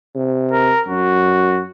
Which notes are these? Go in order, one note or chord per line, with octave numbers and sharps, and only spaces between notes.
C3
A#4
F#2 F#4